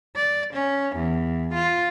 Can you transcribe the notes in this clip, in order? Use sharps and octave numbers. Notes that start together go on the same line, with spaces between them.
D5
C#4
E2
F4